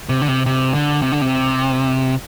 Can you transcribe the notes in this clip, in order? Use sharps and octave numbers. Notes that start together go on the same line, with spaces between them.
C3
D3
C3
C3
D3
C3
D3
C3